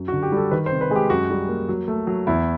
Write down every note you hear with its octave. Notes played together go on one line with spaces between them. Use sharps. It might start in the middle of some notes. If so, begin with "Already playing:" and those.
Already playing: F#2
F#4
D3
G4
G3
A4
D#3 B4
C5
C3
B4
G#3 G#4
G4
F#2 F#4
G3
A#3
F#3
A3
F#3
E2 E4